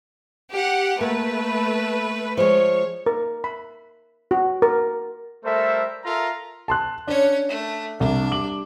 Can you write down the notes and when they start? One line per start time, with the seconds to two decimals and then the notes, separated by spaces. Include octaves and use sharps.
0.52 G4 F#5
1.01 A3 A#3 B4
2.37 F3 G#3 C#5
3.06 A#4
3.44 B5
4.31 F#4
4.62 A#4
5.44 G3 A3 A4 A#4 C5 E5
6.04 F4 A4 A#4 E5 A#5
6.68 A5 C6 F#6
7.07 C#4 D4 C#5
7.49 A3
8.00 C2 D4
8.31 G3 D6 F#7